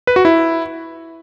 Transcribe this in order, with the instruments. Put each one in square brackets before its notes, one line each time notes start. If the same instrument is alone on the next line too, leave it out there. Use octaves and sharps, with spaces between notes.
[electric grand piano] B4
F#4
E4